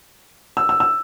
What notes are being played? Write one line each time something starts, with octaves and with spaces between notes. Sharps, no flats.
E6
E6
E6